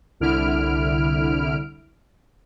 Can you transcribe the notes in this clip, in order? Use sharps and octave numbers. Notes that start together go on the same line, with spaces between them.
C2 D3 E4 F6 D7